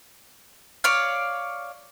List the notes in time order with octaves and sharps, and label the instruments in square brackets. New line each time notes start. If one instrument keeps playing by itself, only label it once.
[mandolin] C#5 D5 F5